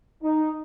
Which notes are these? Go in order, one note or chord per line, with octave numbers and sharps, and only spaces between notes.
D#4